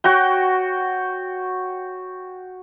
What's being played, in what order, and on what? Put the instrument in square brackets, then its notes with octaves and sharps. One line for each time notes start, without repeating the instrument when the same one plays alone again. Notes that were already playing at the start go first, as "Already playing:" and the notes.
[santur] F#4 C#5 G5